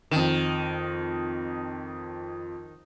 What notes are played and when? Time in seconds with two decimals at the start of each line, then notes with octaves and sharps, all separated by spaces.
0.11 F2 D#3 E7